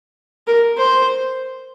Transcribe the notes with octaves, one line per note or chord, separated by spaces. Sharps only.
A#4
C5